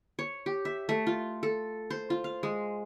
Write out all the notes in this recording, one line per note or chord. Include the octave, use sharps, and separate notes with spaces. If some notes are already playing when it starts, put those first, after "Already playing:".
C#5
G4
E5
A3
F4
A4
C5
F4
F5
G#3